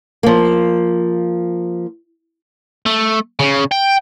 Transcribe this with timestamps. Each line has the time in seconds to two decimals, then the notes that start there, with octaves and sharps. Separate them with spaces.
0.23 F3 A#3
2.86 A3
3.39 C#3
3.72 G5